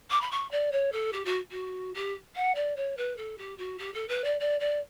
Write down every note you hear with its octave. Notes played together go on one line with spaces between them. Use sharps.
D6
B5
C#6
D5
C#5
A4
G4
F#4
F#4
G4
F#5
D5
C#5
B4
A4
G4
F#4
G4
A4
B4
D5
D5
D5